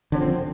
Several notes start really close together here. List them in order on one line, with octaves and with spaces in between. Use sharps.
D3 C#4 F3 C4